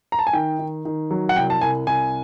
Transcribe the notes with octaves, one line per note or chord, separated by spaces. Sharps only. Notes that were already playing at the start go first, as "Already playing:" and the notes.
A#5
A5
G#5
D#3 G5
D#3
D#3
F#3
F#5
C2 G5
A5
C2 G#5
C2 G#5